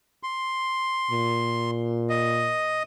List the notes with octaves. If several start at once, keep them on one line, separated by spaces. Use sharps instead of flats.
C6
A#2
D#5